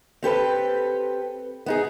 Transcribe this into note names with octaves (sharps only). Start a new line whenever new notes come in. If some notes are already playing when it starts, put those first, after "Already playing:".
C4 G4 A4 B4
B3 D#4 G#4